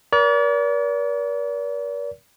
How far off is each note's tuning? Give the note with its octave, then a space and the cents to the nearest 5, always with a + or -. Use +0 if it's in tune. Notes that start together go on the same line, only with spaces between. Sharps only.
A#4 +40 D5 -40